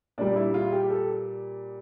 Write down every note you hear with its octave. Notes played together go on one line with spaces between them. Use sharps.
A#2 G3 D4
E4
F4
G4
A4